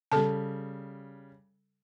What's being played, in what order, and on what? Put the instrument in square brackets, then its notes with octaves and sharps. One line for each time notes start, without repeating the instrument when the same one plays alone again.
[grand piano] C#3 G3 [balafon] A4 A5